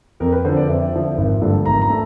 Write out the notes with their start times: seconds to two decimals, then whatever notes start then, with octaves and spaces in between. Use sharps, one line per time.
0.20 F2 A#4
0.32 B4
0.45 D3 F3 C5
0.57 D5
0.69 F2 E5
0.93 D3 F3
1.17 G#1
1.41 G2 D3 F3 A3
1.65 G#1 A#5
1.82 A#5
1.90 A3